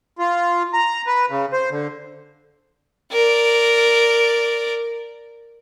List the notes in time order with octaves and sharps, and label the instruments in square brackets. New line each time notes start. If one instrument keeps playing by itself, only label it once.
[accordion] F4
A#5
B4
C#3
C5
D3
[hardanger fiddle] A#4 D5